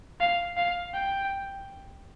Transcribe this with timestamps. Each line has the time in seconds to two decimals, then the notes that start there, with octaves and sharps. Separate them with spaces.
0.20 F5
0.57 F5
0.94 G5